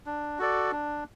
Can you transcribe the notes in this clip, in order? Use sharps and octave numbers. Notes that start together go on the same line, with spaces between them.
D4
F#4 A4 D5
D4